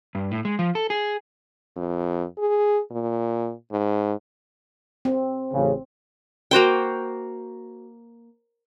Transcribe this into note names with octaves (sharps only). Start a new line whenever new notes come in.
G2
A2
G#3
F3
A4
G#4
F2
G#4
A#2
G#2
C4
A1 C#3
A#3 F#4 C5 G5